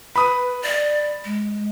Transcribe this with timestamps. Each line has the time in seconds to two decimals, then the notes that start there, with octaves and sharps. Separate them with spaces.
0.16 B4 B5 D#6
0.62 D5
1.24 G#3